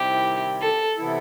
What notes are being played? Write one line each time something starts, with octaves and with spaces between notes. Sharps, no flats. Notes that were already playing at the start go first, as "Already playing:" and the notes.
Already playing: C3 D#3 G3 C4 E4 G4
A4
C3 E3 B3 E4 A4